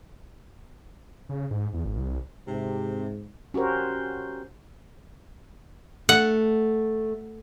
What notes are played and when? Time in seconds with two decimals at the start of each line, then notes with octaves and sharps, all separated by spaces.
1.29 C#3
1.51 G#2
1.73 E2
1.85 G#1
1.97 C2
2.47 G#2 C3
3.54 C#4 F#4 G4 A#4 C5
6.09 A3 F#5